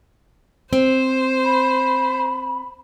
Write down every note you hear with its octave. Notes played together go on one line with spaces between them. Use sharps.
C4 C5
B5